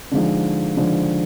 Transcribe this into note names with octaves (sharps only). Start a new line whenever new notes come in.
D3 F3 G#3 D#4
D3 F3 G#3 D#4